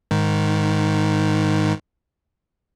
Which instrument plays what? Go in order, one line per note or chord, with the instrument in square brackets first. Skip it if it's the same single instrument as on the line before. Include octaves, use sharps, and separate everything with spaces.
[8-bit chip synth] G#2 D#3